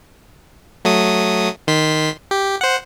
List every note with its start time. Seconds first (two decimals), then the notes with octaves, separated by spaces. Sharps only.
0.85 F#3 A3 D#6
1.67 D#3 C6 B6
2.31 G4
2.61 C5 F#5